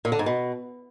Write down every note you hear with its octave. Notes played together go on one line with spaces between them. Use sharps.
A#2
D3
G#2
B2